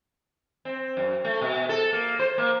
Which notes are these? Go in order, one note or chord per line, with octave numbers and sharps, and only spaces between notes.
C4
F#2
A3
B2
A4
A#3
C5
A#3